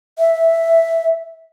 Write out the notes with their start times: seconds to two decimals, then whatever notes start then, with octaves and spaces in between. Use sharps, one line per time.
0.19 E5